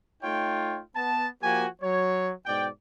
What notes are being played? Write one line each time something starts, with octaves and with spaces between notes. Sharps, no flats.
A3 D#4 F4 C#5 G5
B3 A5
F3 A#3 F#4 G4 G#5
F#3 C#5
G#2 B2 D5 G5